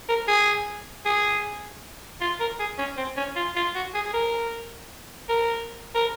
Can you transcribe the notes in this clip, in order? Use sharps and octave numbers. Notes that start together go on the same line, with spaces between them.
A#4
G#4
G#4
F4
A#4
G#4
C#4
C4
C#4
F4
F4
F#4
G#4
G#4
A#4
A#4
A#4